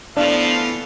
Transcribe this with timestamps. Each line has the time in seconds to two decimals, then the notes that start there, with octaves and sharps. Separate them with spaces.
0.17 E3 F3 A3 B3 D4 F5